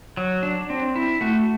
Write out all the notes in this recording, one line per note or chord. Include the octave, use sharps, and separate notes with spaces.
F#3
D4
C4
E4
A3 F#4